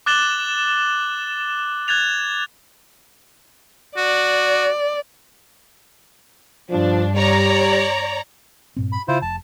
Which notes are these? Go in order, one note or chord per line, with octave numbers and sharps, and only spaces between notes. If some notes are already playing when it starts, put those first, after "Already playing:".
D6 F#6 A6 E7 F#7 G7
F#6 G#6 A6 F7
F#4 D5
G2 F3 D4
G3 C#5 D5 A#5
G2 A#2 C4
B5
C#3 E4 F4 C5
F1 A5